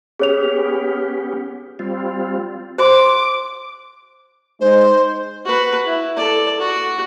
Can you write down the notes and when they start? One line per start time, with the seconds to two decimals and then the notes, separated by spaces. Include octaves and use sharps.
0.20 B3 C#4 G4 G#4 C#5 F7
1.79 G3 C4 F4
2.78 C5 C6 D6
4.61 G#3 D#4 C5
5.45 F#4 B4
5.86 E4
6.16 A4 D5
6.60 F#4